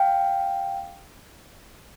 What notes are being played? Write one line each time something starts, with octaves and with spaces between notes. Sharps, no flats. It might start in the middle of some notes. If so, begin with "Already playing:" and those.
Already playing: F5 G5